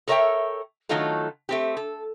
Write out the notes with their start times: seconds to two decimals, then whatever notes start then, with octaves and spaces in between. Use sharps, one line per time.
0.07 A4 A#4 C#5 D#5 E5 G5
0.89 D#3 F#3 A3 D#4 F4 A4
1.49 A3 C4 G4
1.77 A4